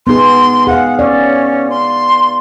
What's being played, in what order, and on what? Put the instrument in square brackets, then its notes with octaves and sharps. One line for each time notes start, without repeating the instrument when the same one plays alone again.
[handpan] B3 D#4 G#4 [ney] C6
[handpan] G#4 F5 [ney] F#5
[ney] C#4 [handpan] D5
[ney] C6